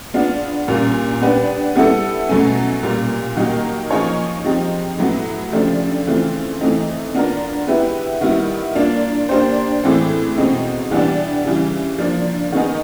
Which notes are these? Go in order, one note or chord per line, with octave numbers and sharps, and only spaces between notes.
G#3 B3 D4 F4
A#2 G3 A#3 C#4
B3 D4 G4 B4
G3 B3 E4 A4
B2 F#3 A3 C#4
A#2 G3 A#3
D#3 F#3 A#3 D#4 G4
F3 A#3 D#4 G#4 C#5
F3 G#3 C4 D#4 G4
A2 F#3 B3
C#3 F3 A3 D4 G4
C#3 E3 A3 C4 F4
E3 A3 C4 D#4
B3 D4 F4 A#4
G#3 B3 E4 G4 B4
D#3 G3 B3 E4
A#3 D4 F4
A#3 D4 G4 C5
A2 E3 G#3 C4
B2 G#3 C4 D#4
E3 G3 B3 D4 G4
C#3 E3 G3
F3 A#3 D4
D#3 G#3 B3 D#4 G#4